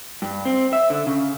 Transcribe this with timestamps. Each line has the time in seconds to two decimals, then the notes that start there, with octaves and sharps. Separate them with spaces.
0.22 G2
0.45 C4
0.73 E5
0.90 D3
1.07 C#3